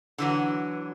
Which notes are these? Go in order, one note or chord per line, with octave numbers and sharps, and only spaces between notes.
D3 E3 F#3